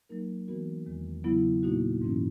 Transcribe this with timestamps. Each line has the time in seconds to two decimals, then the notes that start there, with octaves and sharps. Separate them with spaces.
0.09 F#3 A#3 D#4 A#4
0.48 E3 G#3 B3 F#4 A#4
0.86 E2 D#3 G#3
1.24 C#3 F#3 B3 E4
1.63 A#2 A#3 D#4 F#4
2.02 G#2 E3 A#3 C#4 E4